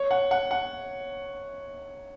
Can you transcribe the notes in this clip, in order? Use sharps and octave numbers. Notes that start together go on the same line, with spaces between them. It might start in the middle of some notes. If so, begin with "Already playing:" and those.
Already playing: C#5
F#5
F#5
F#5